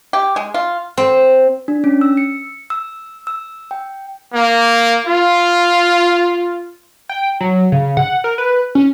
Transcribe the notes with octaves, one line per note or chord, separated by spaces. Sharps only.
G4
G#3
F4
C4
D4
C#4
E6
C#7
E6
E6
G5
A#3
F4
G5
F#3
C#3
F#5
A#4
B4
C#4